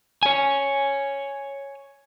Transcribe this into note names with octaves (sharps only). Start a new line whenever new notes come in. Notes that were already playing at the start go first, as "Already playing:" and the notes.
C#5 G#5